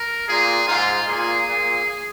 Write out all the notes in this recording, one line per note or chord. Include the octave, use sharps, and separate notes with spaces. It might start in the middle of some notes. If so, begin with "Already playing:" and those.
Already playing: A#4
A#2 G#4
G#2 F4
A#2 G#4
A#2